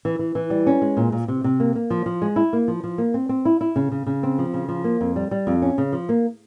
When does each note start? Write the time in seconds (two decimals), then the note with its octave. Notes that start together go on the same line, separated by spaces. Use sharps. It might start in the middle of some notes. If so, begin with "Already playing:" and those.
0.05 E3
0.19 E3
0.35 E3
0.50 G3
0.67 C#4
0.82 G#3
0.97 A#2
1.12 A#2
1.28 C3
1.44 C3
1.60 A#3
1.75 A#3
1.90 F3
2.06 F3
2.22 G#3
2.36 E4
2.53 A#3
2.68 F3
2.84 F3
2.98 A#3
3.14 C4
3.29 C4
3.45 E4
3.61 E4
3.76 C#3
3.92 C#3
4.06 C#3
4.23 C4
4.38 F3
4.54 C#3
4.68 F3
4.84 A#3
5.01 F2
5.16 G3
5.31 G3
5.47 F2
5.62 C#4
5.78 C#3
5.92 F3
6.09 A#3